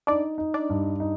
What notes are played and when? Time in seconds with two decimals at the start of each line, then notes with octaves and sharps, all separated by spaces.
0.07 D4 D#4 D5
0.38 D#4
0.54 D4 D5
0.69 G2
1.00 D#4